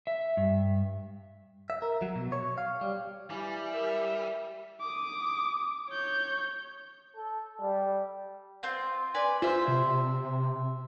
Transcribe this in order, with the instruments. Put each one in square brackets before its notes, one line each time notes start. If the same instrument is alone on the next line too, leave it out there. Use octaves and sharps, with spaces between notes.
[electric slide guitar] E5
G2
[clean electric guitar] E5
A#4
F#3
B2
C#5
F5
G3
[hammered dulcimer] E3 [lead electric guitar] G3 [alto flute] G#5
[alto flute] A#4 [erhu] E5
[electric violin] D6 D#6
C#5 G6
[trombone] A4
G3
[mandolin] C4 F4 G6
B4 D5 G#5
[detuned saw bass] F4 [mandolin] C5 E5
[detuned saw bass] C3